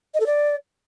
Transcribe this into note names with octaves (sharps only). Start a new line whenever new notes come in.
D#5
A4
D5